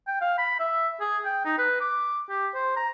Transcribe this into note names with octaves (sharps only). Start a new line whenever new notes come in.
G5
F5
B5
E5
G#4
G5
D#4
B4
D6
G4
C5
A#5